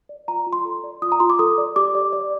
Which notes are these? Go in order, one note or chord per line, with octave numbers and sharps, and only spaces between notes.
D5
F4 A#5
F4
C6
A4
D5
F4 D#6
A#5
F4 C6
D6
A4 D#6
D5
G4 D6
D5
D5